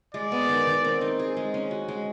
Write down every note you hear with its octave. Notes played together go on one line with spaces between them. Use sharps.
G#3 D5
B3
D#3
D#3
C4
D#4
G#4
G#3
C#4
F#4
G#3